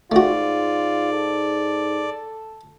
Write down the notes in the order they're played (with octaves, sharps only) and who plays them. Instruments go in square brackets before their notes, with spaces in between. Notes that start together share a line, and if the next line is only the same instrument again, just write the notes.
[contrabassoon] G#2 [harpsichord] A3 F#4 [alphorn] F4 [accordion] D5
[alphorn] A4